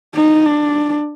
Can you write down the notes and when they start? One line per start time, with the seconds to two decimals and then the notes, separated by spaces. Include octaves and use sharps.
0.15 D#4
0.46 D4